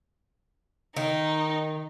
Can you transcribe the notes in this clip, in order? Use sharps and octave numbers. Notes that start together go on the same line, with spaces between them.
D#3 D#4